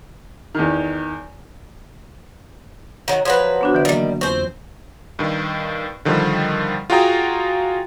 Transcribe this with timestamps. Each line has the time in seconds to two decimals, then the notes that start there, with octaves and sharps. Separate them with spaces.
0.55 E2 D#3
3.08 D#3 F#3
3.25 F3 F#3 B4 G#6 A#6
3.61 B3 D4 F#4
3.73 D3 E3 D5
3.85 D#3 F#3 G3 A#3
4.21 F2 C4 C5 C#6
5.19 G2 D#3
6.05 D3 D#3 F3 G3
6.90 F4 F#4 G#4 G5 A#5 D#6